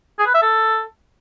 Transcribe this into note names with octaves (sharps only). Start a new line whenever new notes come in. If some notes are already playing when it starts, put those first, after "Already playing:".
G#4
B4
E5
A4